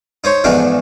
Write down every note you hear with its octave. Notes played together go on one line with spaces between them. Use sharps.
D#4 C5 C#5
E2 G#2 F3 A3 D4 D#4